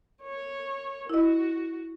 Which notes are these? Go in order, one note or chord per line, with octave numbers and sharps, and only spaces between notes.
C#5
E4 F#4 D#5